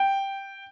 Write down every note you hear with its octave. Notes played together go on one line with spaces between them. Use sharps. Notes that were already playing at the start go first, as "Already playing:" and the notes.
Already playing: G5